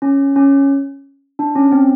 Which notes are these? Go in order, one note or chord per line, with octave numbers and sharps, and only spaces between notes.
C#4
C#4
D4
C#4
C4